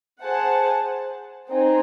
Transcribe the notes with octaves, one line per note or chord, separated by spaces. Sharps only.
G#4 C5 F#5 A5
C4 D#4 G#4